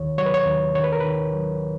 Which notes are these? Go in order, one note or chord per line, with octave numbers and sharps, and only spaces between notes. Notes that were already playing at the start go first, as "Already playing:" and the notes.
Already playing: D#2 D#3 C#5
F#3 C#5
B4
C#5
D#2
D#3 C#5
B4
A#4
D#3 B4
F#3